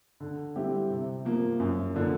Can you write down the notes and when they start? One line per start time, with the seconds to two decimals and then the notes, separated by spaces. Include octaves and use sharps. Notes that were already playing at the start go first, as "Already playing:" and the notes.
0.20 D3
0.56 G3 C4 E4 G4
0.90 C3
1.25 F3 A#3
1.60 F#2
1.94 D3 F3 A#3 D4